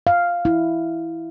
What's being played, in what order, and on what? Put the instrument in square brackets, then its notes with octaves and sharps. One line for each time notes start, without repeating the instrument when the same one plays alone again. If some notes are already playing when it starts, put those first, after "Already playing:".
[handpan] F5
E4